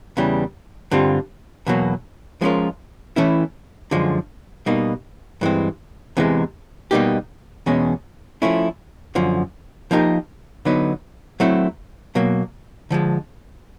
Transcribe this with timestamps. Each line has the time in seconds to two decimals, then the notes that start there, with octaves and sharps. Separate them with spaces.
0.17 E2 C#3 E3 G3
0.91 G2 D3 G3 C4 F4
1.67 E2 B2 F#3 A#3
2.41 F3 G#3 C#4 F4 A#4
3.16 E3 A3 C#4 E4
3.91 F#2 D3 F3 G#3
4.66 B2 G3 A#3 D#4
5.41 G2 E3 G#3 C4
6.17 E2 C3 E3 G#3
6.91 B2 G3 A#3 D#4 G4
7.66 E2 B2 G#3 C#4
8.42 F3 A3 C#4 E4
9.15 F#2 D3 F3
9.91 F3 A#3 D#4 G4 A#4
10.65 D3 F#3 B3 D#4
11.40 F#3 A3 C4 E4
12.15 B2 F#3 A#3
12.91 D3 F3 G#3